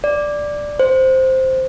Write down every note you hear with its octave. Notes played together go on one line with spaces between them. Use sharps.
D5
C5